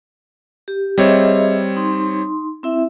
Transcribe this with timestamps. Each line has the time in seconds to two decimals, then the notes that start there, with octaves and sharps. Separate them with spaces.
0.68 G4
0.98 G3 C4 G#4 C#5 D#5 E5
1.76 D#4 C6
2.63 C4 E4 E5